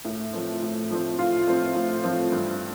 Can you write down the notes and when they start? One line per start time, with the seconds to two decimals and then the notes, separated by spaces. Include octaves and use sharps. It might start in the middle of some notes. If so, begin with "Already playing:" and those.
0.05 A2
0.33 F3 A3 C4
0.62 A2
0.90 F3 A3 C4
1.18 A2 F4
1.47 F3 A3 C4
1.75 A2
2.04 F3 A3 C4
2.32 G2